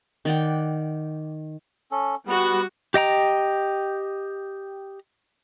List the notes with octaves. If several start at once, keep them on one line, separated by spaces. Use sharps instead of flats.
D#3 D5 F#5 G5
C#4 A4
G3 B3 F#4
G4 D#5 G5 A#5